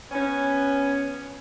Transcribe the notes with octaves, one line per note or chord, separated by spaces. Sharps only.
B3 C#4